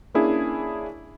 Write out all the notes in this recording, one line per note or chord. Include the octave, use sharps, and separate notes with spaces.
A#3 C#4 D4 E4 G#4